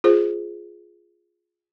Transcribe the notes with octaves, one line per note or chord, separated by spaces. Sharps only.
F4 G#4 C5